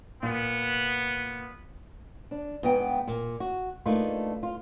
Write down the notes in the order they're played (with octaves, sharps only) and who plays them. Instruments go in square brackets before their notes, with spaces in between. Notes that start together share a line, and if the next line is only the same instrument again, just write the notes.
[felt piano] A#2 [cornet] B3
[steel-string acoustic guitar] D4
G#2 B3 G5
[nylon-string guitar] A#2
F#4
A3 A#3 D4 D#4 F4 B4
F4